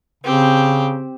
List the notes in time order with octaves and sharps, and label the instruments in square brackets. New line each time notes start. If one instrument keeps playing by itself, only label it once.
[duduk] C#3 [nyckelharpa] C4 G4